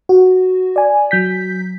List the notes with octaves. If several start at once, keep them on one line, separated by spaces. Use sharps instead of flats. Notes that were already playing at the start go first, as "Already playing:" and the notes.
F#4
D5 G#5
F#3 G6 B6